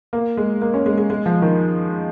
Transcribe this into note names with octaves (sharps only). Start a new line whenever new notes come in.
A#3
G#3
A#3
C#4
G#3
G#3
G#3
F3
D#3